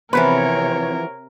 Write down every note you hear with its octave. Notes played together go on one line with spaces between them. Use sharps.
C3 E3 F3 B3 A#4 B4 C#5